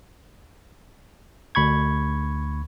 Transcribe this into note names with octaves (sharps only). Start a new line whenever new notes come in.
D2 B5 C#6 G#6